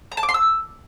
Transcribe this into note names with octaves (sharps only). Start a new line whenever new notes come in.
A#5
A5
D6
C6
E6